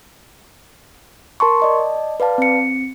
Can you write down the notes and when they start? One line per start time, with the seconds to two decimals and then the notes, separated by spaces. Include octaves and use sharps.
1.40 A#4 A5 C6 C#6
1.60 D5 D#5 A5
2.20 B4 D5 F5 A5
2.38 C4 C#7